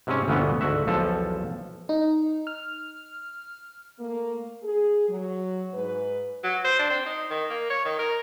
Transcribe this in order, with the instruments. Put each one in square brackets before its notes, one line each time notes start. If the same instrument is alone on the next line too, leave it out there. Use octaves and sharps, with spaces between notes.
[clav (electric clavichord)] G#2 C3 G3 C4 C#4
G1 D2 A#2 E3 B3 C#4
D2 G#2 F#4 E5
B1 E2 F3 A4
[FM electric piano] D#4
F6
[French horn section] A3 A#3
G#4
F#3
G#2 B4
[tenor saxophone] F#3
C5
D4
C4
D#4
D#3
A#3
C#5
D#3
A#4